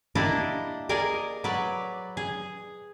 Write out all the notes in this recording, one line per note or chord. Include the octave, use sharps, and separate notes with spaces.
A#3 D4 E4 G4 D5 D#5
G#4 A#4 D5 D#5
F#3 B4 D5
G#4